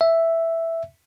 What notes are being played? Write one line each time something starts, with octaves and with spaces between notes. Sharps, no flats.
E5